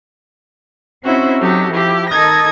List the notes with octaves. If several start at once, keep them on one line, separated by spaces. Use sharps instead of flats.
C4 C#4 D#4 E4 F#4 C5
F#3 D#4 F#4 G4 A4
F3 E4 G4
D#3 D#4 A4 D#6 G#6 A#6